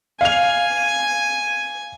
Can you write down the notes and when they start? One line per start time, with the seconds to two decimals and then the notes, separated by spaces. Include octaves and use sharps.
0.21 F5 G#5 F7